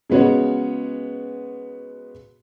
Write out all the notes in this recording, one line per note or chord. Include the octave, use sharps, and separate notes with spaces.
C#3 G#3 B3 F#4 C#5